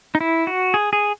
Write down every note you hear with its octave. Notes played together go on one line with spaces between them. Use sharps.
D#4
E4
F#4
G#4
G#4